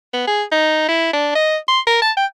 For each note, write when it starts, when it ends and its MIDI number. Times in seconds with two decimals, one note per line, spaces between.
0.13 0.24 59
0.27 0.43 68
0.52 0.87 63
0.89 1.11 64
1.13 1.33 62
1.35 1.57 75
1.68 1.80 84
1.87 1.99 70
2.02 2.11 81
2.17 2.25 79